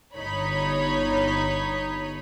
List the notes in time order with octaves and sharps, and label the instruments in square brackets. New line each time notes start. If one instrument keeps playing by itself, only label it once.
[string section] G1 D#4 C#5 B5